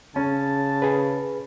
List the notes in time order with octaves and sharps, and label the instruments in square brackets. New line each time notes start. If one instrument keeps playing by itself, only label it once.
[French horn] C#3 [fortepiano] C#4 [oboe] A5
[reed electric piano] G#4 B4